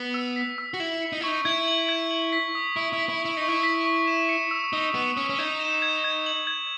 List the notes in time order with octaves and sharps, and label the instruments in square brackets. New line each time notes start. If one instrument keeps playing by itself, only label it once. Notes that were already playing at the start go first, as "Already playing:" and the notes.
Already playing: [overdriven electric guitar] B3
[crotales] E6
B6
E6
[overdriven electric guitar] F#4
[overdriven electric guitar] E4 [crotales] F#7
[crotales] C#7
[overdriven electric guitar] D#4
E4
[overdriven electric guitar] D#4 [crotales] C#6
[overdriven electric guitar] E4 [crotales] G#6
[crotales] F#7
G#6
F#7
B6
D#6
[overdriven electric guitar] E4 [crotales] C#6
[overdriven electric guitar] E4
[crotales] B6
[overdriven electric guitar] E4
[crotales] C#6
[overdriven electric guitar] E4
D#4
[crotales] C#6
[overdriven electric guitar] E4
[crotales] B6
C#6
E7
C#7
E6
[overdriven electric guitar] D#4 [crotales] D#6
[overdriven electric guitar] B3 [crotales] D#7
[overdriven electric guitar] C#4 [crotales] D#6
[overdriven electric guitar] C#4
[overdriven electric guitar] D#4 [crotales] G#6
[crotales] E7
G#6
G#6
F#7
G#6